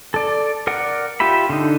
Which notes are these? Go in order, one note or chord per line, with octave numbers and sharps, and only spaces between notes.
A4 D5
A#4 D5 F#5
F4 G4 E5 B5
D3 D#4